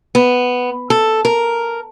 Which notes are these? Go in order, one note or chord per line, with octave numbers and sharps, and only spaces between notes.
B3
A4
A#4